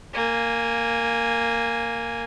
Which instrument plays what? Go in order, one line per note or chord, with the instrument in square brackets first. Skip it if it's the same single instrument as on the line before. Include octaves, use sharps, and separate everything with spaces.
[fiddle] A#3 G#5